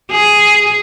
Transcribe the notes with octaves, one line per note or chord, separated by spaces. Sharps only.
G#4